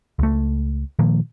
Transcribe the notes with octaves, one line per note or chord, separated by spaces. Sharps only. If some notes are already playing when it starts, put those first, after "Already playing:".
C#2 A3
A#2 D#3 F3 A#3